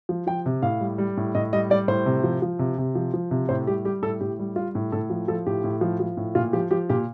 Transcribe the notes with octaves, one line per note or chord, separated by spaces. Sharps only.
F3
F3 G5
C3
A2 F5
G3
G3
A2
A2 D#5
G3 D#5
G3 D5
A2 C5
C3
F3
F3
C3
C3
F3
F3
C3
A2 C5
G3 G4
G3 G4
A2 A4
A2 G4
G3
G3 F4
A2
A2 A4
F3
F3 A4
A2 G4
A2
F3
F3
A2
A#2 F4
F3 G4
F3 G4
A#2 G4